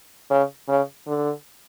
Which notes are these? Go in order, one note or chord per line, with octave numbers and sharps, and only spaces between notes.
C#3
C#3
D3